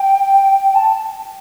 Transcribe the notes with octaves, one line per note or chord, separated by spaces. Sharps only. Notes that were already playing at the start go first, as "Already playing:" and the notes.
Already playing: G5
A5